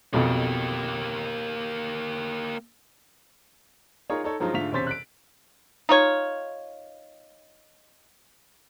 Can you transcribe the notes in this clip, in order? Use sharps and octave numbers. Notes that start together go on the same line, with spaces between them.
B1 F2 B2 A#3 G4
D#4 F4 G#4 A#4 C#5
D#4 A4 C#5
G2 F3 F#3 G#3 D#4 F4
G#2 D3 A3 F4 B6 F7
E1 C3 C#4 C5 A6 B6
F#6 B6 D7
D#4 F4 C#5